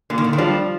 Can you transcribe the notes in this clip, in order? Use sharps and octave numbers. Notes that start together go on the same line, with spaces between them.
A#2 D3
D#3
D3
D#3
F3 G3 D4